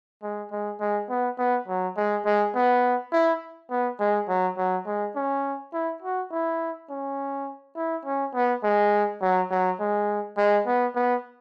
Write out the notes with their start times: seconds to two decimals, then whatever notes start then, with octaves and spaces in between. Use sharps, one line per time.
0.23 G#3
0.51 G#3
0.80 G#3
1.09 B3
1.38 B3
1.68 F#3
1.96 G#3
2.25 G#3
2.55 B3
3.13 E4
3.70 B3
3.99 G#3
4.28 F#3
4.57 F#3
4.86 G#3
5.16 C#4
5.73 E4
6.02 F#4
6.31 E4
6.89 C#4
7.76 E4
8.05 C#4
8.34 B3
8.63 G#3
9.21 F#3
9.51 F#3
9.79 G#3
10.37 G#3
10.66 B3
10.95 B3